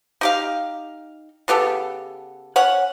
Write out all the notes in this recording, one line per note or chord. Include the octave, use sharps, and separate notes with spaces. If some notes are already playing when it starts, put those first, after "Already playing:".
D#4 G4 F5
C#3 B3 G4 A4
C#4 C#5 F#5